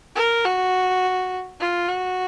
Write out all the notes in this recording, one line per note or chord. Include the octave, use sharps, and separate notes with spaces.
A#4
F#4
F4
F#4